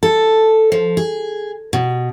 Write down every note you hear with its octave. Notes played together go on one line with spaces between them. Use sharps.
A4
F3
G#4
B2